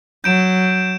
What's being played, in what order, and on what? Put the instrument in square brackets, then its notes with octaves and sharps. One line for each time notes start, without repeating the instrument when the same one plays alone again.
[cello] F#3 [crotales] G6 D7 E7